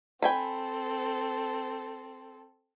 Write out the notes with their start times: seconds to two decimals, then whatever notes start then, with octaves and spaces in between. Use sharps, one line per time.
0.22 C4 A4 G5 G#5 B5